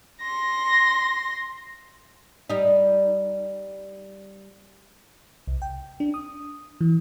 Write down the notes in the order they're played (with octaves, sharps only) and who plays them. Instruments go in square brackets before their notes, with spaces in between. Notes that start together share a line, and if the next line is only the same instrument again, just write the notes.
[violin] C6 A#6
[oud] G3 D#4
[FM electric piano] C2
G5
D4
D#6
E3